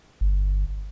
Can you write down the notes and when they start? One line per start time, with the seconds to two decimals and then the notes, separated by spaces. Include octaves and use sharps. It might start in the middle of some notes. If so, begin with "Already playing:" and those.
0.21 G1